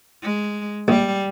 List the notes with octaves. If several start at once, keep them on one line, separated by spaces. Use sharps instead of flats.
G#3
A#1 G3